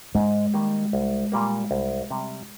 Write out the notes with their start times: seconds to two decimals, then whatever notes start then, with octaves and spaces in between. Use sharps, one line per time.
0.15 G#2 G#3
0.54 D#3 G3 A#3 D#4
0.93 C2
1.32 A#2 G3 A#3
1.71 C2
2.10 C3 G3